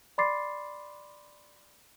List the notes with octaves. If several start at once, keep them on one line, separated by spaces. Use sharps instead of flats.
D5 B5 C6 D6 A6 C7